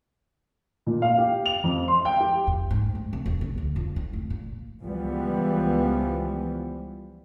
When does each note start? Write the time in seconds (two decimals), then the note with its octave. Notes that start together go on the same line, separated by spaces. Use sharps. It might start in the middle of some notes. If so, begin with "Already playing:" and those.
0.87 A#2
1.02 F5
1.18 G4
1.46 F7
1.64 F2
1.88 C6
2.05 G5
2.20 G4
2.47 F2
2.70 G#2
2.95 A2
3.13 C3
3.26 E1
3.41 B1
3.58 D2
3.76 F2
3.96 E4
4.13 F1
4.30 A#2
4.82 C#2 E3 F3 G3 B3